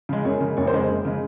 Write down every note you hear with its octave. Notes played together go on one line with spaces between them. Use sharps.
C#3 G#3
F#2 C#5
C#3 G#3
F#1 C#5
C5
F2 C#3 G#3
F#1
C#3 G#3